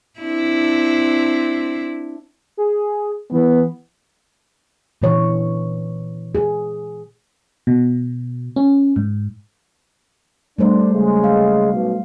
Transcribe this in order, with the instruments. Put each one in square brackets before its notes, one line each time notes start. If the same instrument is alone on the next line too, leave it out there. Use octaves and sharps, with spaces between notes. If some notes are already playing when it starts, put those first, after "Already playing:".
[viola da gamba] C4 D4 E4
[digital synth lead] G#4
[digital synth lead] E3 [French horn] B3
[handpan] A#2 D3 E3 C#5
G#4
[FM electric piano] B2
C#4
G#2
[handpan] G3 A3 C5 [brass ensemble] D4
[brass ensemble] C#3 G#3
[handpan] F5
[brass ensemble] B1